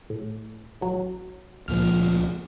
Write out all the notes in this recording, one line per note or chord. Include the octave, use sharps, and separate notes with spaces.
A2
A1 F#3
C#2 A#2 F3 F6